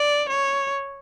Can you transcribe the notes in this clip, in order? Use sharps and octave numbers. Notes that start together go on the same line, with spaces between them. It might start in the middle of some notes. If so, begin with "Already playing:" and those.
Already playing: D5
C#5